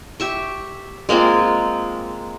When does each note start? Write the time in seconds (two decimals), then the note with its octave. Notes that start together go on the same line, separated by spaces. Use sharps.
0.20 G4 E5 C#6
1.09 G#3 A#3 C4 F4